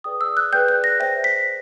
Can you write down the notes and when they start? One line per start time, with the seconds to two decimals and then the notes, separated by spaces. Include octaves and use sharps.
0.04 G#4 B4 D5 G5 D#6
0.21 E6
0.37 F#6
0.53 G#4 B4 D5 G5 G6
0.68 F#6
0.84 A#6
1.00 C5 E5 G5 A#6
1.24 B6